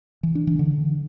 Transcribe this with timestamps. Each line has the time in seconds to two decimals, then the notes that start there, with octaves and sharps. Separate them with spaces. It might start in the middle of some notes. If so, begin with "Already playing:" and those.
0.23 E3
0.35 D4
0.47 E3
0.59 D3